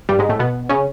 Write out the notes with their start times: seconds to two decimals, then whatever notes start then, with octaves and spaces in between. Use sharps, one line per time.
0.09 G2 G3
0.19 G#2 G#3
0.29 A2 A3
0.39 B2 B3
0.69 C#3 C#4